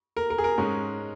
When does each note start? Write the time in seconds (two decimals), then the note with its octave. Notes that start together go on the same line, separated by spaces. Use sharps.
0.17 A#4
0.30 A#4
0.38 G#4
0.44 A#4
0.58 G#2 G#3 C#4